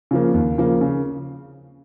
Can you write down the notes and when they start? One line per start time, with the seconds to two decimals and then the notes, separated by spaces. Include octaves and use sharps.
0.11 C#3 F3 A#3
0.34 D#2
0.58 C#3 F3 A#3
0.81 C#3